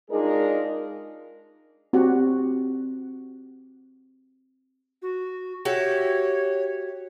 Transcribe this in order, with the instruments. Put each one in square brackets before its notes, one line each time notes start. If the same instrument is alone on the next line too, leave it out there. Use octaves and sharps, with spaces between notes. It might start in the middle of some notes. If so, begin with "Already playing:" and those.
[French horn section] G#3 D4 D#4 F4 G#4 A#4
[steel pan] C4 F#4 G4 F#5
[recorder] F#4
[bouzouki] F#4 G4 E5 [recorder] C#5